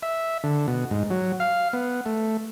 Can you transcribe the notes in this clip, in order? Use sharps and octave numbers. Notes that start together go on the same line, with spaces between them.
E5
D3
B2
G#2
F#3
F5
B3
A3